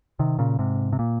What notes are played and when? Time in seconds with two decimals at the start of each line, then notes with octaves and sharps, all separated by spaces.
0.19 C3 D#3
0.39 A#2 C#3
0.59 G#2 C3
0.93 C3
0.99 A#2